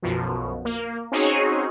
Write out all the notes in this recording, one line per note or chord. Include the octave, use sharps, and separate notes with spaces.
B1 F#2 B2 F3
A#3
C4 C#4 D#4 F#4 G#4 C#5